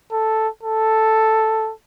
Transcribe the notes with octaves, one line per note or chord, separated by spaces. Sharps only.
A4
A4